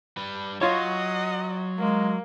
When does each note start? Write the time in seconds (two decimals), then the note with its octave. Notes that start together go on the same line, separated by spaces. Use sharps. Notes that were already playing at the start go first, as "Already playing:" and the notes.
0.17 G3 B4
0.61 F#3 F4 C#5 D#5 F#5
1.78 G#3 A#3